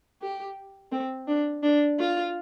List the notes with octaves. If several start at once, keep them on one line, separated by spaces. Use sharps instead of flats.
G4
C4
D4
D4
F4